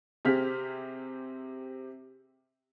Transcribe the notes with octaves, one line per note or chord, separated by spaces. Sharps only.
C3 C4 G4 G#4 F6 B6